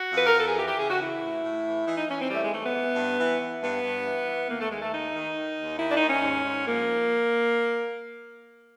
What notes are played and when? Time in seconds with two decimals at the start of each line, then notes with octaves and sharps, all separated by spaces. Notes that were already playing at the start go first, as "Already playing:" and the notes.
Already playing: F#4
0.11 F2 B4
0.26 A#4
0.33 F2 A4
0.45 G#4
0.56 E3 G4
0.66 G4
0.77 C#3 G#4
0.89 F#4
0.99 E3 E4
1.21 A2
1.43 A2
1.65 E3
1.86 E3 D#4
1.97 D#4
2.08 E3 C#4
2.19 C4
2.30 A2 G3
2.36 A3
2.41 G#3
2.51 E3 A3
2.63 B3
2.74 E3
2.95 G2
3.18 E3
3.39 E3
3.61 G2 B3
3.82 G2
4.05 E3
4.26 E3
4.48 D#2 A#3
4.59 A3
4.70 D#2 G#3
4.81 A3
4.91 D#3 D#4
5.14 D#3
5.35 D#3
5.57 D#2
5.79 D#3 E4
5.89 D4
5.94 D#4
6.01 D#2
6.09 C#4
6.23 G#2
6.45 G#2
6.66 F3 A#3